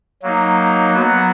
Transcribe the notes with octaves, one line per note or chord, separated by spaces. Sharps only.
F#3 A#3 D#4
F#3 B3 F#4